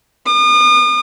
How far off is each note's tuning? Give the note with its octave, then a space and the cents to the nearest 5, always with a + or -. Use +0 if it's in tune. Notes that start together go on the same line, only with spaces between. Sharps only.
D#6 -40